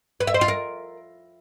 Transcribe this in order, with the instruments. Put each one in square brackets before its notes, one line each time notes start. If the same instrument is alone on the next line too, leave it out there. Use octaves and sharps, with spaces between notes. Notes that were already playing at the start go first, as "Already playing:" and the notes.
[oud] B4
E5
C5
F4
A#4